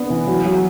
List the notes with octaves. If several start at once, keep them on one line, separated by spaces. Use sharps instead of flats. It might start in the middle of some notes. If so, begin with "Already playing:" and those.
Already playing: B3 D4
E3
F#3
F#3